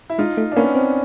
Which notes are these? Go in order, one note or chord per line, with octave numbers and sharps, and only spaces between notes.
E4
G#3 D#4 F4
A3
D4
A#3 B3 C#4
C4